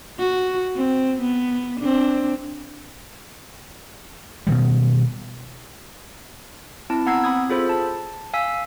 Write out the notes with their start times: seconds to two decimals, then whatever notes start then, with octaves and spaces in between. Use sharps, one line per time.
0.19 F#4
0.76 C4
1.21 B3
1.80 C4 D4
4.47 B2 D#3 G3
6.90 C4 E4 A5
7.06 B3 F#5 A#5 E6 G#6 C7
7.24 C4 B5 D#6 G#6
7.50 F4 G#4 A4 C5 B5
7.69 A5
8.33 F5 G#5 E6 B6